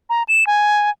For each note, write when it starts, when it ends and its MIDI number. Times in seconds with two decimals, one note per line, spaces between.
0.10 0.23 82
0.28 0.47 100
0.47 0.90 80